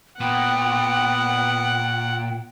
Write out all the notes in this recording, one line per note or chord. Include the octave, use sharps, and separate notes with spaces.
A#2 B3 F#5 G5